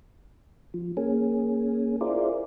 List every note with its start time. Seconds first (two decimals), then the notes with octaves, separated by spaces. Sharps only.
0.74 F3
0.97 A#3 C#4 G#4
2.01 E4 F4 G#4 A#4 C5 D5